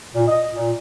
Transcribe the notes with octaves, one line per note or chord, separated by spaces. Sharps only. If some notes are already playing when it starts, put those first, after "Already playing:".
A#2
D#5
A#2